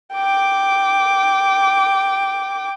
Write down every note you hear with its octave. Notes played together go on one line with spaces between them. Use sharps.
G5 D6